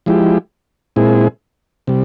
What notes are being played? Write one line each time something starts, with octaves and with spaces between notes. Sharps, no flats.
F3 G#3 E4 G4
A#2 G#3 C4 E4 G#4
C3 G3